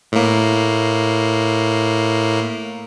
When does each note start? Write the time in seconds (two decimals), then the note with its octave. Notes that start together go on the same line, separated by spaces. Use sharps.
0.12 A2 A#3